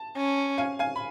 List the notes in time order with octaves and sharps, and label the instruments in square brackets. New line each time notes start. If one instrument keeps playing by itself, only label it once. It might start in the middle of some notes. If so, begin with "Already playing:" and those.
Already playing: [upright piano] A5
[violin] C#4
[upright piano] F5 G#5
F5 G#5
B5